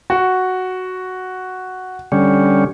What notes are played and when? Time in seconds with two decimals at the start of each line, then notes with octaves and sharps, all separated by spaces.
0.10 F#4
2.12 D3 G3 C#4